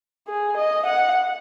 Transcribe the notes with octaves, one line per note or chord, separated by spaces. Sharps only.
G#4
D#5
F#5